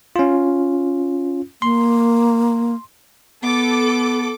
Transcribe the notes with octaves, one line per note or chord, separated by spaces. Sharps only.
C#4 F4
A#3 C6
B3 A4 D6